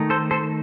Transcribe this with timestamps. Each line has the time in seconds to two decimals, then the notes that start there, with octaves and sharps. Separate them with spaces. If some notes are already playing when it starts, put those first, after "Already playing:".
Already playing: D#3 A3 D#4
0.10 A4 C5
0.31 A4 C5